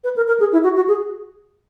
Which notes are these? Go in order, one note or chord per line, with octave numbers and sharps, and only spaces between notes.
B4
A#4
A#4
G#4
E4
F#4
F#4
G#4